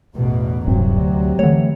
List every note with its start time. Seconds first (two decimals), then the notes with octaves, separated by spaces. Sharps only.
0.15 A1 E2 B2
0.67 D#1 G2 C3 F#3 C4
0.97 D2
1.39 D3 E3 A3 C#5